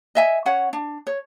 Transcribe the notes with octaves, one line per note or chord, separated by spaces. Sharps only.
D#5 E5 G#5
C#4 C#5 F#5
D4
C#5